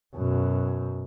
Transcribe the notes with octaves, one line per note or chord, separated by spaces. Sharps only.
F#2 B2